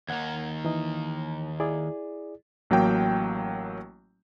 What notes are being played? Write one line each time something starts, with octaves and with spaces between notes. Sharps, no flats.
D#2 D#3 F#5 G#6
E3 D#4
E4 G#4 D5
A1 F#3 A#3 G5